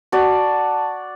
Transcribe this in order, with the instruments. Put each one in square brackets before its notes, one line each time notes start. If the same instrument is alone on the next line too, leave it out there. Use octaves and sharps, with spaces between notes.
[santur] F#4 D5 [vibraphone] A5